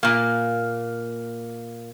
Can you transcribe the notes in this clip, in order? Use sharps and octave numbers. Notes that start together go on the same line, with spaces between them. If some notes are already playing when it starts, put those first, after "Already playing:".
A#2 A#3